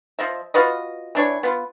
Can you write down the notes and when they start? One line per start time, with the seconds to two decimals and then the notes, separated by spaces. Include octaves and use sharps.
0.19 F3 D#5 E5
0.54 F4 F#4 B4 D#5
1.15 E3 D4 C#5
1.43 B3 F4